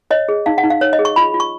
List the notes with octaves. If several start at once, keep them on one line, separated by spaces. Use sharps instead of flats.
C#5 D#5
G#4
D#4 F5
F#5
D#4
F5
C#5
D#5
G#4
C#6
F4 B5
F4
C#6